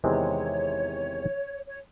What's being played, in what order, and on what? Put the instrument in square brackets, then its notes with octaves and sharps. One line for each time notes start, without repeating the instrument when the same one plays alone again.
[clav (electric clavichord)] E2 C3 D#3 G#3 C4 [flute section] C#5
[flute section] C#5